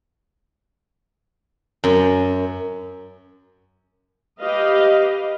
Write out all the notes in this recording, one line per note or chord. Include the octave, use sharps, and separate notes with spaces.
F#2
G4 B4 D#5 F5